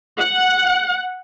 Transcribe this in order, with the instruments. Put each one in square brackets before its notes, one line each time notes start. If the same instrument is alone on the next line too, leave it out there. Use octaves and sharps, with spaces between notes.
[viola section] F#5